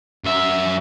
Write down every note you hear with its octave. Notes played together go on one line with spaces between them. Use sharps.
F#2 E5